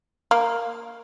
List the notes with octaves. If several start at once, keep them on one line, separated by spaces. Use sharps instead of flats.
A#3